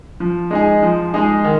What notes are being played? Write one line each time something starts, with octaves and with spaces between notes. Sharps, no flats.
F3
G#3 D#4 G#4
F3
G#3 D#4 G#4
D#3